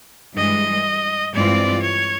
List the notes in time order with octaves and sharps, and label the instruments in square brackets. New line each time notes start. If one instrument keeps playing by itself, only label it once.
[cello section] G2 E3 G#3 [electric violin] D#5
[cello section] G2 E3 G#3 C4 F4 [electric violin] D5
[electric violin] C#5